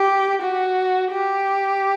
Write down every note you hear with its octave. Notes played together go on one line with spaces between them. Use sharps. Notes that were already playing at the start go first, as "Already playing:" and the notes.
Already playing: G4
F#4
G4